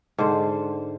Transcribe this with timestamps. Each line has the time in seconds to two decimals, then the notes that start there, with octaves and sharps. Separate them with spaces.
0.18 G#2 D3 C5